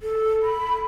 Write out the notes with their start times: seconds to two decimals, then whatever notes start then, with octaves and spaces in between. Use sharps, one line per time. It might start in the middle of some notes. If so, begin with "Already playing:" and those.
0.02 A4
0.42 B5